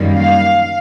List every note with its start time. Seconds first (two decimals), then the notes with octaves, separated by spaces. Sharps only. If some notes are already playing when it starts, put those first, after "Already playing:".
Already playing: F#2 D#3 G3 A#3
0.13 F5